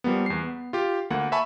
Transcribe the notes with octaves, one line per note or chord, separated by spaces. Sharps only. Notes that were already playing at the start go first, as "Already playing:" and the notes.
F3 G3 A#3 B3
E2 C7
B3
F4 G4
D2 A#3 F#5
E5 G#5 A5 B5 C#6